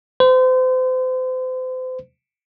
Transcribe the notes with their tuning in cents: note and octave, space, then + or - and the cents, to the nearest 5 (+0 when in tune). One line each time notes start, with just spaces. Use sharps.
C5 -35